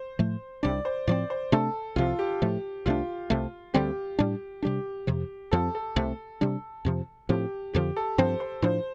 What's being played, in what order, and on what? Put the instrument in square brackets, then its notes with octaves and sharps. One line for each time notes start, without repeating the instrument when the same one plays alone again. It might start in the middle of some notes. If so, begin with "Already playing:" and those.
Already playing: [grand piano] C5
[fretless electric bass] A2 F3 A3
[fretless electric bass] C2 C3 G3 D4 [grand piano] D5
[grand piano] C5
[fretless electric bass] A2 F3 C4 [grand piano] D5
[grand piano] C5
[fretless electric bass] C3 A3 D4 [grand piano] A4
[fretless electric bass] C2 C3 F3 [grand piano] F4
[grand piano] G4
[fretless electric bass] A2 F3 A3
[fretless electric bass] C2 C3 A3 D4 [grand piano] F4
[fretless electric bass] C2 C3 A3
[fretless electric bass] D2 D3 G3 C4 [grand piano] G4
[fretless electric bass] A2 G3 D4
[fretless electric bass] C3 G3 D4 [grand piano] G4
[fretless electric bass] F2 C3 F3
[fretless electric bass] F2 F3 C4 [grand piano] A4
[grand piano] A4
[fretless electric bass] C2 C3 A3
C3 G3 D4
F2 C3 F3
[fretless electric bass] A2 F3 C4 [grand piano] G4
[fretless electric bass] F2 D3 F3 [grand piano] G4
[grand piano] A4
[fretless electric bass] G2 F3 C4 [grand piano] C5
[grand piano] C5
[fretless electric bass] A2 F3 D4 [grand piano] C5